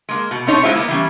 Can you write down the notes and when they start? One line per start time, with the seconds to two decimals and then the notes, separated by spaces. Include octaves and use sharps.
0.09 G#3 A#3
0.31 B2
0.47 B2 C4 D4 D#4 C#5
0.63 G#3 E4 F4 B4 C5 E5
0.76 A#3 B3
0.88 E3 G3 C#4